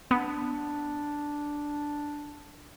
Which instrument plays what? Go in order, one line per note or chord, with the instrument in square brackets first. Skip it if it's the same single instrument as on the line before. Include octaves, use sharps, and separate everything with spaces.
[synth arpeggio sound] B3 [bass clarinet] D4